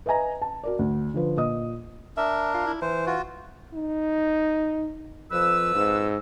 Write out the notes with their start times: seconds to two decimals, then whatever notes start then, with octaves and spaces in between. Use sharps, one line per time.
0.06 B4 D#5 E5 G#5 A#5
0.42 A5
0.64 F#4 A#4 D5
0.79 D2
1.14 D3 F3 B4
1.37 A#2 D#5 D#6
2.17 D4 A#4 E5
2.54 F4
2.67 E4
2.82 E3 C5
3.06 F4 F#4
3.74 D#4
5.32 F2 F3 B4 E6
5.75 G#2